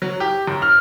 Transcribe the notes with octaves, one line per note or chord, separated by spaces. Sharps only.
F#3
G4
F#2
F6